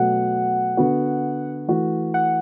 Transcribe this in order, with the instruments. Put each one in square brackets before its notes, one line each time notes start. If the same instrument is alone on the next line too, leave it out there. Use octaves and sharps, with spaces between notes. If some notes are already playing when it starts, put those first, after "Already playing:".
Already playing: [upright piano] B2 F#3 A3 F#4 [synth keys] F#5
[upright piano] D3 B3 F#4
E3 A3 F#4
[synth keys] F#5